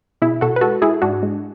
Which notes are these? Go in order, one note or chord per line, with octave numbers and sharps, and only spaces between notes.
B2 E4 G#4
B2 F#4 A4
B4
G#3 F#4 A4
G#3 E4 G#4
G#2 D4 F#4
G#3